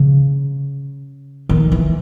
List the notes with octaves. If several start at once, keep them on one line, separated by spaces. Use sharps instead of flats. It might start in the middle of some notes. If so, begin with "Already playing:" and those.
Already playing: C#3
D#3
E3